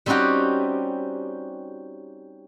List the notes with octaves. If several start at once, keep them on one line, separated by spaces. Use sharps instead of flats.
G3 C4 C#4 D#4 F#4 G4